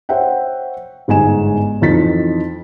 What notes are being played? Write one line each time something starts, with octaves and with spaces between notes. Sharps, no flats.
C5 C#5 E5 F#5 G5
G1 G#2 G4 G#5 E7
F2 E3 D#4 A6 B6